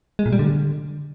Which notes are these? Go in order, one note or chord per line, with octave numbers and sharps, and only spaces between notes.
G#3
A#2
G3
D3